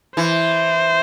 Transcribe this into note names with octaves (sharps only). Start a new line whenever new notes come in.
E3 C5